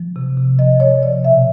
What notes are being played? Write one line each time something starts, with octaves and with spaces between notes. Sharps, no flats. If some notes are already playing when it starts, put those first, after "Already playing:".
Already playing: F3
C3
C3
F3 D#5
F3 C#5
C3 D5
B2 E5